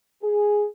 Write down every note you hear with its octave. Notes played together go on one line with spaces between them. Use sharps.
G#4